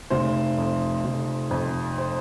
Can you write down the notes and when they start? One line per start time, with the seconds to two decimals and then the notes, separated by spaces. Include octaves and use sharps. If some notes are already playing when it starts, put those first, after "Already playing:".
0.10 F1 C5
0.58 F2
1.05 F1
1.51 F2
1.98 C5